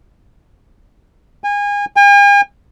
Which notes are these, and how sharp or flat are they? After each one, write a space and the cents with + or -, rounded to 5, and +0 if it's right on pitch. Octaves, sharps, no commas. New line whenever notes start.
G#5 -30
G#5 -45